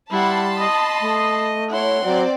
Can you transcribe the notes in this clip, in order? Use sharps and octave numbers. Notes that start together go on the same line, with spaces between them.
G3 E4 F#5 A5 B5 C6
D#5 D#6
A3
E4 C#5 F#5 C6
F#3 C4 D5